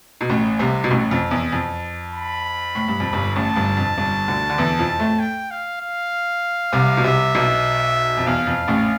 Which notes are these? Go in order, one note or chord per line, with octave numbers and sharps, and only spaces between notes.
B2
A1 A2
C2 C3
B2
A1 A2
F2
E2
F2
B5
A2
G2
F2
G1 G2
A1 A2 A5
G1 G2
F2
G1 G2
D2 D3
D3
E2 E3
F2 F3
A2 A3
G5
F5
F5
C2 C3
B2
C2 C3 E5
B1 B2
F2
E2 F5
F2
A1 A2